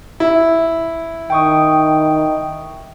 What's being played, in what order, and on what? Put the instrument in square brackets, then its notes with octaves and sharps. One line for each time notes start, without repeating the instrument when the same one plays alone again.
[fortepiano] E4
[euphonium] D#3 [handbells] G5 C#6 D#6